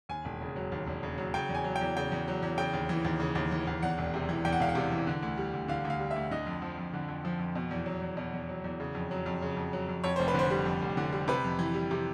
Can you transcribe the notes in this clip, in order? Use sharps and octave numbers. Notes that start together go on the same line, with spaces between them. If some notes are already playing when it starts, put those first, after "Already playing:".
D#2 G#5
E1
C#3
F#3
D#2
E1
C#3
F#3
C#3 G5
E2
G#5
F#3
G5
E2
C#3 G5
E2
F#3
E2
C#3 G5
D#2
E3
D#2
C#3
D#2
E3
D#2
E2 F#5
E1
C3
E3
E2 G5
F#5
E1 F5
F#5
C3
E3
D3
D2
G3
D2
D3 F5
D2
F5
G3
E5
D2
D3 D#5
F2
F3
F2
D3
F2
F3
F2
B2
E2
F#3
E2
B2
E2
F#3
E2
C#3
F2
F#3
F2
C#3
F2
F#3
F2
F2 C#5
F1 C5
B4
D3 C5
G3
F2
F1
D3
G3
C3 B4
F2
E3
G3
C3